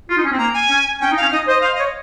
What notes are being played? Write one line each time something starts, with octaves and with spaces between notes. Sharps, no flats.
F4
D#4
C#4
C4
A#3 A#5
G#5
C#4
C#4 G5
D#4
C#4 F5
D#4 D#5
C5 D#5
C5 F5
C#5 D#5